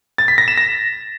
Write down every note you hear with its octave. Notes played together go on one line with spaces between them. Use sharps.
A6
B6
A#6
E7
A#6